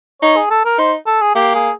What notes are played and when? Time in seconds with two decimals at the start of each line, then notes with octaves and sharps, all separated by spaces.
0.22 D#4 C#5
0.36 G#4
0.51 A4
0.65 A#4
0.78 D#4 C5
1.07 A4
1.22 G#4
1.35 A#3 G4
1.55 G#4